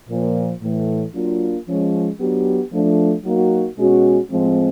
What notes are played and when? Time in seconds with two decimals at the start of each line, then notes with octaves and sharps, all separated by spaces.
0.10 A#2 F3 A#3
0.62 A2 E3 A3
1.15 F#3 A#3 D4 F4
1.68 F3 G#3 C#4
2.20 F#3 B3 D4 G4
2.73 F3 A3 D4
3.25 F#3 A#3 D#4 F#4
3.78 B2 G#3 C#4 F#4
4.31 A2 F3 G#3 C4